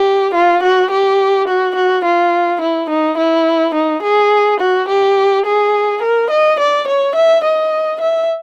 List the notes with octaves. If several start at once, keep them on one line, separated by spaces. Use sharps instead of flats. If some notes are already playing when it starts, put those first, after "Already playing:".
Already playing: G4
F4
F#4
G4
F#4
F#4
F4
E4
D#4
E4
D#4
G#4
F#4
G4
G#4
A#4
D#5
D5
C#5
E5
D#5
E5